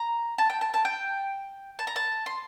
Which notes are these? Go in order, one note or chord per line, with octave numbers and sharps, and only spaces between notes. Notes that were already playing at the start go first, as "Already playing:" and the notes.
Already playing: A#5
A5
G5
A5
A5
G5
A5
A#5
A5
C6